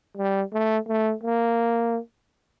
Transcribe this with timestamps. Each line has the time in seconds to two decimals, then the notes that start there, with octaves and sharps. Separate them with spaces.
0.17 G3
0.53 A3
0.88 A3
1.24 A#3